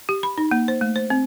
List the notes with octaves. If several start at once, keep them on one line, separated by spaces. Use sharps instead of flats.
G4
B5
D#4
A#3
C5
A3
C5
C4